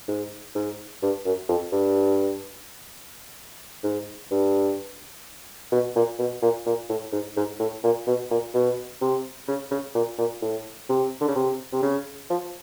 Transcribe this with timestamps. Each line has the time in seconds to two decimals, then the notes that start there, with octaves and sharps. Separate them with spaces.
0.08 G#2
0.55 G#2
1.02 G2
1.25 F#2
1.49 F2
1.72 G2
3.84 G#2
4.31 G2
5.72 B2
5.96 A#2
6.19 B2
6.42 A#2
6.66 A#2
6.89 A2
7.12 G#2
7.37 G#2
7.60 A2
7.84 A#2
8.07 B2
8.31 A#2
8.54 B2
9.01 C3
9.48 C#3
9.71 C#3
9.95 A#2
10.18 A#2
10.42 A2
10.89 C3
11.21 D3
11.28 C#3
11.35 C3
11.72 C3
11.82 C#3
12.30 F3